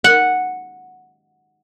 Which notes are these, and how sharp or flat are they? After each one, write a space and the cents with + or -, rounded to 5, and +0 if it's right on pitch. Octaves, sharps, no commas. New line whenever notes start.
F#5 -5